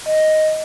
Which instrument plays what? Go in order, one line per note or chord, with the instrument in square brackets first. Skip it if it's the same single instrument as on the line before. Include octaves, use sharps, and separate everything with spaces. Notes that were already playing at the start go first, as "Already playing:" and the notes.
[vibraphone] D#5